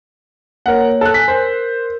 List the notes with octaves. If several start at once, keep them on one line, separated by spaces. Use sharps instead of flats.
A#3 A#4 C#5 F#5
A4 F#6
G#5 B6
A#4 C5